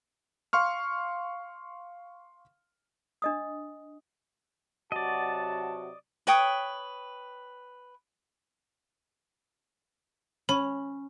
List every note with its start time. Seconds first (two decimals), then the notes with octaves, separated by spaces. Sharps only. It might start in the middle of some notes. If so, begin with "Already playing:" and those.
0.53 F5 C6 C#6 F6
3.22 D4 D#5 D#6
4.92 C3 F#3 F#4 D5 D#5 A5
6.27 B4 C#5 G5 D#6
10.49 C#4 B5